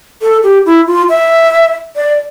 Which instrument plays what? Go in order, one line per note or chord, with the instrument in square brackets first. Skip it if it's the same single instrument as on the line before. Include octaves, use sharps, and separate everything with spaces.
[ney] A4
G4
E4
F4
E5
D5